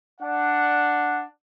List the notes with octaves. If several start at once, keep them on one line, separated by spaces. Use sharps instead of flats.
D4 F#5